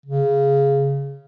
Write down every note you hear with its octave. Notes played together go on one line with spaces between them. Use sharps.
C#3